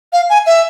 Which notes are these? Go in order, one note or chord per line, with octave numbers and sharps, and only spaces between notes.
F5
G#5
E5